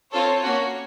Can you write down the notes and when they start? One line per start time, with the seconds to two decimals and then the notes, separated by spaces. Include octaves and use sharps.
0.11 C4 F4 A4 C#5
0.43 A#3 C#4 F#4